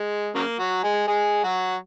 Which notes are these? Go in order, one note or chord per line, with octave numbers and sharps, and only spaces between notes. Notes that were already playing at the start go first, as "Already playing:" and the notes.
Already playing: G#3
C#3 F#3 A#3
F#3 F#4
G#3 G#4
G#3 G#4
F#3 F#4